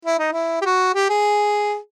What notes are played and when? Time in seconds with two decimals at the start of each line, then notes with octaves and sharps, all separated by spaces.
0.05 E4
0.19 D#4
0.33 E4
0.61 G4
0.65 F#4
0.94 G4
1.10 G#4